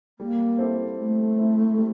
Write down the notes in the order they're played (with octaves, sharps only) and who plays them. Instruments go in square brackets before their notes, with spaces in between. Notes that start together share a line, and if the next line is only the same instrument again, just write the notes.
[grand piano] G3 [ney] A#3
[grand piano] C4 E4 A4 C5
[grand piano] G3 [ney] A3
[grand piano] C4 E4 A4 C5
G3